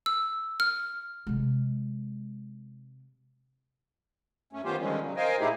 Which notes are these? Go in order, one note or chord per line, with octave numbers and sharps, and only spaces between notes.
E6
F6
C3 G#3
F#2 A3 C#4
D#3 B3 C#4 F4 G4 C5
D3 D#3 F3 G3 G#3 C#4
C#3 F#3
A#4 C5 D#5 F5 G5 G#5
A#2 A3 D#4 E4 G4 G#4